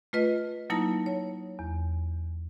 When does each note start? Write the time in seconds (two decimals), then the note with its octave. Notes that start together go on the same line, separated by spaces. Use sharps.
0.13 A3 F4 B4 D#5
0.70 F#3 A#3 D#4 E4 A5 A#6
1.06 C#5
1.59 E2